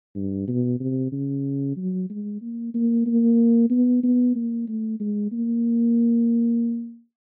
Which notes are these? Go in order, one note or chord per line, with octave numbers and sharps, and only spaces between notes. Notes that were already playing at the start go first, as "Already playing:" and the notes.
G2
B2
C3
C#3
F#3
G#3
A#3
A#3
A#3
B3
B3
A#3
A3
G#3
A#3